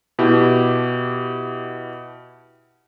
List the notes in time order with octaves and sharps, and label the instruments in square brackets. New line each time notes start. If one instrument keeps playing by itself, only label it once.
[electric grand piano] B2 E4 G4